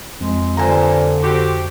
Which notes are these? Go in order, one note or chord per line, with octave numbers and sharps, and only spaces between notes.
F2 G#3
G2 A#2 D3 C5 G#5 A#5
C4 F#4 G4